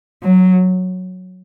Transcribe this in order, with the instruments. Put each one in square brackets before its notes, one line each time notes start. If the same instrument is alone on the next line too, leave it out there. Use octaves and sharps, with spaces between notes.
[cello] F#3